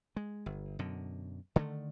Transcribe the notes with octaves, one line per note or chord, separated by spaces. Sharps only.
G#3
G1
F#2 B2 D3
D3 D#3 G#3 A3